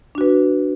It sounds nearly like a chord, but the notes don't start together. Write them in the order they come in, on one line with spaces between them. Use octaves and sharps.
D4 F#4 B4